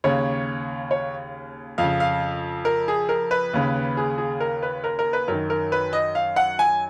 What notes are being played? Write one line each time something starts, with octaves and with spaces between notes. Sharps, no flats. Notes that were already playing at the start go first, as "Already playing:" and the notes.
D#2 C#3 C#5
C#5
F2 F5
C#3
F5
A#4
G#4
A#4
B4
D#2 C#3
G#4
G#4
A#4
B4
A#4
A#4
B4
F#2 D#3 A#4
A#4
B4
D#5
F5
F#5
G#5